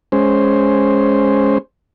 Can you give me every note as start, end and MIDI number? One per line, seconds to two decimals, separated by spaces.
0.12 1.58 56
0.12 1.58 61
0.12 1.58 72